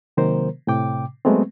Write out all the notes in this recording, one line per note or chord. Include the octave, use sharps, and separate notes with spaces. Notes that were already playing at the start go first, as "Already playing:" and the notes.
C3 D#3 F#3 A#3 A#4 C5
A2 C3 G5 D6
F#3 G#3 A3 B3 C4